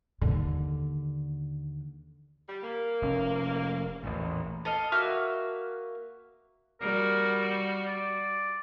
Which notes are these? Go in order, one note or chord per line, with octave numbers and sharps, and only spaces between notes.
D#2 D3
G3
A#3
F1 C#4
A1 E2 A#2
A4 D#5 F5
A#3 F#4 E5 F6
G3 F#4 A#4
D5